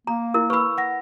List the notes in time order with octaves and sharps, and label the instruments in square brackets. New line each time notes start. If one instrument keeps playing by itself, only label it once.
[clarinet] A#3 [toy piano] A#5
[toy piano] E4 A#4
[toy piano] B4 B5 [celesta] C#6 E6
[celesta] F#5 A#6